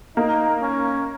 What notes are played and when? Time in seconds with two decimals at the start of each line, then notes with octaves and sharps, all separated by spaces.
0.16 A#3 D#4
0.62 C#4